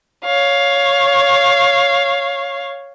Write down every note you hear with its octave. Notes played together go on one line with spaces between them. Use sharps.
C#5 F5